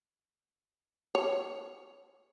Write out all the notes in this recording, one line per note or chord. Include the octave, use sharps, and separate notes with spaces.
C#5